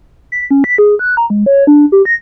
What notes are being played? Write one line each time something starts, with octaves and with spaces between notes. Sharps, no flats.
B6
C#4
B6
G#4
F#6
A#5
G#3
C#5
D4
G4
A#6